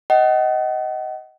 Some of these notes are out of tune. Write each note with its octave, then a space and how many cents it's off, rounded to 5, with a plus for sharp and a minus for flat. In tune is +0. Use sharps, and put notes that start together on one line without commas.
D#5 +10 F#5 +40